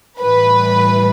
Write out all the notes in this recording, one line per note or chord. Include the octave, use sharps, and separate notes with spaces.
A2 E3 G3 B4